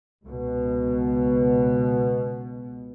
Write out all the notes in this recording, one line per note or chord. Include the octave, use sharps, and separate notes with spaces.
C#2 B2